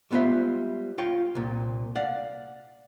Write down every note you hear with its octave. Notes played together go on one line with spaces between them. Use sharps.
G3 G#3 B3 F4 C5 E5
F4 C#5 F5 G5
C2 A#2
D5 F5 F#5